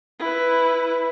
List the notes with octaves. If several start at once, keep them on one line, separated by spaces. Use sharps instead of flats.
E4 B4